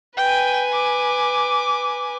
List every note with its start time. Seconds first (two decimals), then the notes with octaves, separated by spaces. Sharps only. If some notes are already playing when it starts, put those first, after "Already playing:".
0.17 B4 G5 G#5
0.73 D6